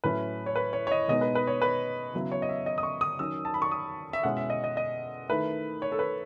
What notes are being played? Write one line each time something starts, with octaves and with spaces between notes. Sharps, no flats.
A2 F#3 C#4 E4 B4
C#5
B4
C#5
C#5
D#5
B2 G#3 B3 D#4 D#5
B4
B4
C#5
B4
C#3 F#3 B3 E4
C#5
D#5
E5
D#5
D#6
C#6
D#6
D#3 F#3 C#4 E6
A5
B5
C#6
D#6
E5
B2 G#3 C#4 E4 F#5
E5
D#5
D#5
D#5
D#3 A3 E4 B4
C#5
A4
B4